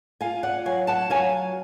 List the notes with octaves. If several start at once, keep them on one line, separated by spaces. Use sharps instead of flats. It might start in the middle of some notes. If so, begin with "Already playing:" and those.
F4 F5 G#5
D5 F#5
F#3 F5 G#5
F#5 A5
F#3 F5 G#5